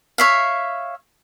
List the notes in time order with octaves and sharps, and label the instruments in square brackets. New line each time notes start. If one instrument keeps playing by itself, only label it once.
[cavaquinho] C#5 E5 F5